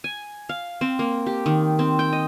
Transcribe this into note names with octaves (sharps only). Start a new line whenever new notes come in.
G#5
F5
C4
A#3
G4
D#3
C4
G5
D#5